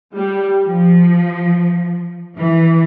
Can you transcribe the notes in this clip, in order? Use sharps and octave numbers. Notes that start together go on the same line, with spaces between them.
G3
F3
E3